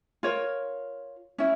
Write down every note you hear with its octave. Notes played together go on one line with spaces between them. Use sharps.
F4 A#4 C#5
C#4 E4